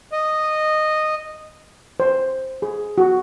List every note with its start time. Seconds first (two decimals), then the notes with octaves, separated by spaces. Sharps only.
0.12 D#5
2.00 C5
2.62 G#4
2.98 F#4